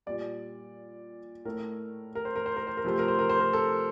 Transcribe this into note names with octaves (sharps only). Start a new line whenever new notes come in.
A#2 G3 D5
A2 A3 A#4
A#4
C5
A#4
C5
A#4
C5
A#4
C3 F3 A3 C5
A#4
C5
A#4
C5
A#4
A4